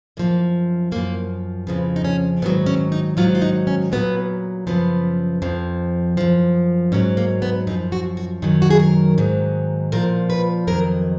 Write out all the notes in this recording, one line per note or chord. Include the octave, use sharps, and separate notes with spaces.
F#2 F3 A#3
F#2 F3 A#3
F2 C#3 F3 B3
D#4
C#4
G#2 D#3 F#3 B3
C#4
D#4
G#2 D#3 F#3 F4
F4
D#4
C#4
A#2 F#3 B3
F#2 C#3 F3 B3
F2 F3
F#2 F3
G#2 F#3 C#4
A#3
B3
F#2 F3 D#4
F#4
F#4
F#2 D#3 F#3
F#4
G#4
A#4
G#2 D#3 F#3
A#2 F3 A#4
B4
F2 D#3 F#3 A#4